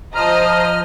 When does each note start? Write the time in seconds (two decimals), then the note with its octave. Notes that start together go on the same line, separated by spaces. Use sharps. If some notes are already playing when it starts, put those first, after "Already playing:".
0.15 F3 C5 D#5 A#5 D#6 F6